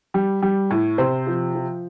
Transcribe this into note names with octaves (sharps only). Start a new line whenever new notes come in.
G3
G3
A2
C3 C5
F3
F3